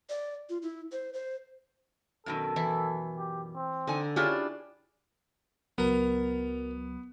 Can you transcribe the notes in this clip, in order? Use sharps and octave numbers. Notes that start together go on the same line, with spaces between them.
D5
F4
E4
C5
C5
F#2 B2 D#3 A4
E3 E4
G4
C4
D3 D#4 G#5
C#4 D4 E4 F4 G4 G#4 D5
C#2 F#3 B3 A#4 A#5